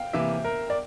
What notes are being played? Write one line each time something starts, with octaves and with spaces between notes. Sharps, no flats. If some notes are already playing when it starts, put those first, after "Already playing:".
Already playing: F5 G5
C3 E3 A#3 E5
A#4
D5